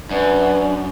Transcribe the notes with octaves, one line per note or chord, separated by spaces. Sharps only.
F#2 D4 B4